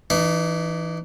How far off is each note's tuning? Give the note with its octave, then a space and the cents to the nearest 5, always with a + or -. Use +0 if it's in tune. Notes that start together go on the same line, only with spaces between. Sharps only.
E3 +0 D#4 -40